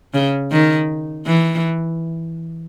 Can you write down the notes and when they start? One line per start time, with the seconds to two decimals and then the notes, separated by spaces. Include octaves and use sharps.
0.14 C#3
0.52 D#3
1.27 E3